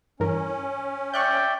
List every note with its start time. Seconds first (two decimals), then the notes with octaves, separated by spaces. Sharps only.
0.20 G2 E3 C#4 A#4
1.14 D5 E5 G5 C#6 F#6 G6